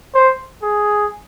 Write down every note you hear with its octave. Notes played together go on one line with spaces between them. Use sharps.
C5
G#4